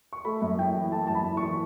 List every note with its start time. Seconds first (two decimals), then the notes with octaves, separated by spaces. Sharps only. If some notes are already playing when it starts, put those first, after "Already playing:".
0.13 C#6
0.25 A3 B5
0.42 F#2
0.59 E4 G5
0.75 E3
0.92 A3 A5
1.07 F#2 A5
1.15 B5
1.25 E4
1.37 C#6
1.43 E3